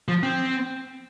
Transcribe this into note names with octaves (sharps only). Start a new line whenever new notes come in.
F3
C4